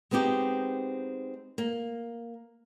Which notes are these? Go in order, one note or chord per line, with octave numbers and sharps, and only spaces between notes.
G#3 B3 C4 D#4 G4
A#3